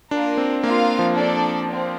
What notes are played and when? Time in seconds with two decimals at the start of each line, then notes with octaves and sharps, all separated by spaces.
0.11 A#3 D4 F4 A#4
0.37 C4
0.63 A#3 F4 A#4 F5
0.99 F3
1.16 D4 A4 D5
1.69 C4